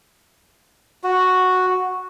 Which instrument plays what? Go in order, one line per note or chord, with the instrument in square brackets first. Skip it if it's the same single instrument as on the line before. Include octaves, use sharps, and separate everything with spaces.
[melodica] F#4